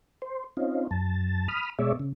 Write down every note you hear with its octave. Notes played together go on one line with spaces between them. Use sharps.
C5
C4 C#4 D#4 F4
F#2 A5
B5 D#6 F6
B2 G#3 C#5 D5 E5
C#3